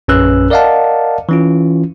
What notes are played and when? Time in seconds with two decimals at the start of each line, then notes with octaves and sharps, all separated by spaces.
0.08 A#1 F#2 C#4 B4 E6 F#6
0.50 A#4 D5 D#5 F5 F#5 A5
1.29 E3 C#4 F4